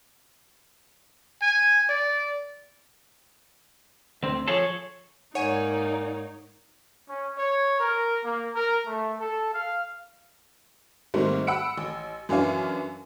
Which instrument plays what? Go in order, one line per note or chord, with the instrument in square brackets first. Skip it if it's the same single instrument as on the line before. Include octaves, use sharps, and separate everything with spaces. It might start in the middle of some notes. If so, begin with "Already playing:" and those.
[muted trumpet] G#5
D5
[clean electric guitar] D2 C4
[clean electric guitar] F3 G#4 A4 [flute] C#5
[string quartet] G#2 A#3 D5 [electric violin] D#4 [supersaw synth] C#5 [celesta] F#5 G#5 D#7
[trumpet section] C#4
C#5
A#4
A#3
A#4
A3
A4
F5
[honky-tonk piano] G#2 D#3 G3 A3 A#3 C4
F#5 B5 E6 C#7 D7
A1
F#2 E3 C#4 D4 F5 G#5